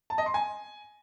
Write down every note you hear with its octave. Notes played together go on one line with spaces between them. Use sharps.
A5
D#5
C6
G#5